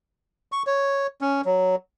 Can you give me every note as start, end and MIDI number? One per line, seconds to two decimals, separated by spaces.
0.52 0.63 85
0.67 1.07 73
1.21 1.41 61
1.45 1.76 54